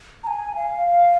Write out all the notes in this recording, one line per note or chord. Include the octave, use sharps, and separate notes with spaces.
A#5
G#5
F5